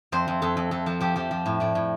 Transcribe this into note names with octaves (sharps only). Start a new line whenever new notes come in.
F2 C5
F2
F2 A4
F2
F2 A4
F3 A4
F3 G4
F3 G4
F3
A2
A2 D5
A2